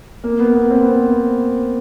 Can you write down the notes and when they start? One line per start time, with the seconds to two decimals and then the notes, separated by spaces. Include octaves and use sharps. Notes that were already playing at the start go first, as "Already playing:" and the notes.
0.24 A#3
0.39 B3
0.54 B3
0.71 C4
0.86 B3